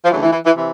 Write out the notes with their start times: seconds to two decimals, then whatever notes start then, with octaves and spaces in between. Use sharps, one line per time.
0.04 F3
0.10 D2 C#3 E3 F#3
0.22 E3
0.32 E3
0.45 E3
0.55 C3 E3